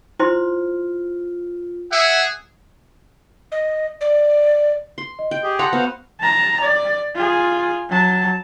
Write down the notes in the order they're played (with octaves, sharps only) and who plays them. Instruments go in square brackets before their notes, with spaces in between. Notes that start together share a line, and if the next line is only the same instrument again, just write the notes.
[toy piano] E4 C5 C6 [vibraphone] F4
[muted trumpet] G#4 [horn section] E5 F#5
[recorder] D#5
D5
[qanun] C6
[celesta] D#5
[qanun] G5
[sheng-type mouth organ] G4 G#4
[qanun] A4 F#5 A#5 [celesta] C6
[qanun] B3 [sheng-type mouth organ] F#4 C5 F5
[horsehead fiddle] A5 A#5
D5
F4 G#4
F#3 A5